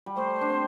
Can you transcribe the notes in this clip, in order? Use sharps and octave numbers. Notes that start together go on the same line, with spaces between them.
G3
A3 C5
D4
C4